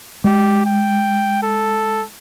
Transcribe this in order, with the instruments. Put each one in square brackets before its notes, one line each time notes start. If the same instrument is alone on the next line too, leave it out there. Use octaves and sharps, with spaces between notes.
[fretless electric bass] G#3 [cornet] G4
[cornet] G5
A4